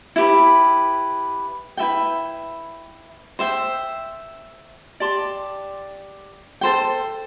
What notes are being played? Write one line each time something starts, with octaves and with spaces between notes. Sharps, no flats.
E4 G4 B4
E4 B4 E5 G5
C5 E5 G5
G4 D5 A5 C6
A4 C5 G5